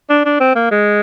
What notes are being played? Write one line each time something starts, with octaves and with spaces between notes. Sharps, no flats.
D4
D4
C4
A#3
G#3